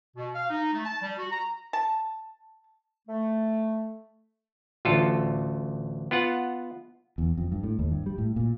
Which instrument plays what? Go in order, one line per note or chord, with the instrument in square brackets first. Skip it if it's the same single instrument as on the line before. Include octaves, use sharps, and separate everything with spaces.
[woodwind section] B2
F5
D#4
A3
A5
G3
F#4
A#5
[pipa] A5
[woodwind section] A3
[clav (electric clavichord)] A1 D2 F4 A4
B3 F4 F#5
[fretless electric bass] E2
F2
G2
A2
D#2
G2
G3
A2
A#2